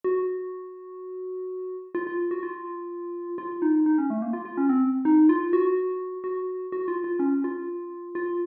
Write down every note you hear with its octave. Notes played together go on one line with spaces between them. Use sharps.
F#4
F4
F4
F#4
F4
F4
D#4
D#4
C#4
A3
A#3
F4
F4
C#4
C4
D#4
F4
F#4
F#4
F#4
F4
F4
C#4
F4
F4